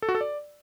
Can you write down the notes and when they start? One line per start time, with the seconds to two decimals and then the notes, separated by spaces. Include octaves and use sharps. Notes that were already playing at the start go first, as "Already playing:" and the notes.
0.02 A4
0.09 F#4
0.15 A4
0.21 D5